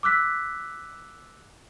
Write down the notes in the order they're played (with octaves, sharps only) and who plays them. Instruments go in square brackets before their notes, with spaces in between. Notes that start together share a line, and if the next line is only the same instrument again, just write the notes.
[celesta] D6 E6 F#6 B6